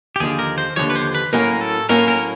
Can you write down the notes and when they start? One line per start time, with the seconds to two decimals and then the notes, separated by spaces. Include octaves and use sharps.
0.16 G4
0.20 D#2 D3 F3 G#4
0.39 A#4
0.58 C5
0.76 D#2 D3 F3 C#5
0.90 B4
0.96 C5
1.15 B4
1.33 A2 F#3 A#3 C#4 A#4
1.61 A4
1.89 A2 F#3 A#3 C#4 A#4
2.08 A#4